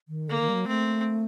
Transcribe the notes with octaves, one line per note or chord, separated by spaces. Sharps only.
D#3
D3 A#3
D#3
G3
F#3
A3 C4